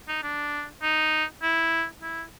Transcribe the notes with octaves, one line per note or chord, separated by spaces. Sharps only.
D#4
D4
D#4
E4
E4